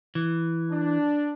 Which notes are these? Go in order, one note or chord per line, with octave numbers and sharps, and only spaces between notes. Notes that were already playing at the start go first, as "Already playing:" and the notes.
E3
D4